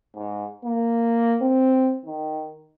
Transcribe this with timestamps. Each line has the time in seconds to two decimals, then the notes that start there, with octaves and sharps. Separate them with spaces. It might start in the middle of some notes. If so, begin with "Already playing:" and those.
0.15 G#2
0.65 A#3
1.42 C4
2.05 D#3